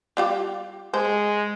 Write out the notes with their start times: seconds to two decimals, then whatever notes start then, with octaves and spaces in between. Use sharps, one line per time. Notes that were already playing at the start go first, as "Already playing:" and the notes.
0.17 G3 F4 G4
0.94 G#3 C5